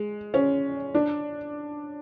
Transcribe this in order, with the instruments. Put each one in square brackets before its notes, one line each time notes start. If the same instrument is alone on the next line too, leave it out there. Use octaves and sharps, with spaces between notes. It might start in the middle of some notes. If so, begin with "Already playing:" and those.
Already playing: [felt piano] G#3
C#4
D4